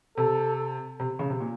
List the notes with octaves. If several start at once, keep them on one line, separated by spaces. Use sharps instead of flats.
C3 A4
C3
C#3
C3
A#2